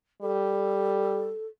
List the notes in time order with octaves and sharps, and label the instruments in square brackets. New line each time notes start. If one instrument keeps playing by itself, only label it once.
[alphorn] G3 [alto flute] A4